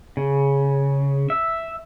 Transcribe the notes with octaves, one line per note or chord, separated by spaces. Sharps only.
C#3
E5